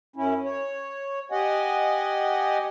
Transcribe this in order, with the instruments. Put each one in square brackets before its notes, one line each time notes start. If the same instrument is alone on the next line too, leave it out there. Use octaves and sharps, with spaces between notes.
[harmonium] F#2 C#4 E4
C#5
G4 D#5 F#5 G#5